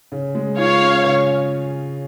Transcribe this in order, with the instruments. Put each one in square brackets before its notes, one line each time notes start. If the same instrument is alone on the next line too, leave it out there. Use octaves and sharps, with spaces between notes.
[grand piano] C#3
G#3
[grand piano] F4 [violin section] C#5 F5
[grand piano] C#4
C#3